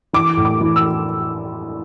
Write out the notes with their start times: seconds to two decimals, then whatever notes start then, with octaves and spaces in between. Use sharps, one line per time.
0.13 E3 D6
0.37 A2
0.45 D6
0.61 E3
0.76 E6